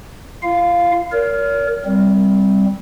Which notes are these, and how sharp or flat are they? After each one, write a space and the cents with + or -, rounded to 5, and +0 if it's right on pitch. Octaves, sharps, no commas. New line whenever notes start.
F4 -40 F5 +0
A#4 +0 C#5 +45
G3 +0 C4 +0